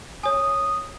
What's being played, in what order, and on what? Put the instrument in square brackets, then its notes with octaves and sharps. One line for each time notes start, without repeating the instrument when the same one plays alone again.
[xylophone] C#5 G#5 [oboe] D#6